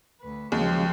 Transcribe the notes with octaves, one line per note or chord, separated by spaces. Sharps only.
D2 B4
D#2 C#3 F3 F#3 G#3 G5